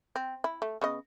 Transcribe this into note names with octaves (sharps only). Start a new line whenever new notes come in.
C4
E4
A3
C#3 B3 D#5